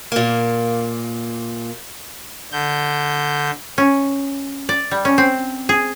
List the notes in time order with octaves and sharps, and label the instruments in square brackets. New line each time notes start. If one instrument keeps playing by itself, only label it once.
[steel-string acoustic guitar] A#2 A#3
[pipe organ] D3 G6
[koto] C#4
D5
G3
C#4
C4
G#4